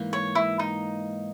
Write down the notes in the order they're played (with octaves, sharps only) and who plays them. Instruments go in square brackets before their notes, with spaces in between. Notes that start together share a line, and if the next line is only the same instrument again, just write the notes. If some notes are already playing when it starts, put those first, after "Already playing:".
Already playing: [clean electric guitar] G#2 E3 A#3
[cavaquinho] C#5
E4
D#4